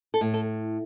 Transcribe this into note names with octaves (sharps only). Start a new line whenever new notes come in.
A4
A2
A4